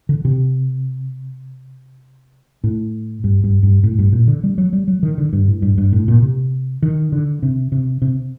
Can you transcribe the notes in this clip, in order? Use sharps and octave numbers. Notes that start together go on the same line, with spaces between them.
D3
C3
A2
G2
G2
G2
A2
G2
A#2
D3
G3
F#3
G3
F#3
D#3
D3
G2
A2
G2
G2
A2
A#2
C3
D#3
D3
C3
C3
C3